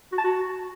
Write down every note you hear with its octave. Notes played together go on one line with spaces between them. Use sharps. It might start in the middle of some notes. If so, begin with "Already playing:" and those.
F#4
A5
F#4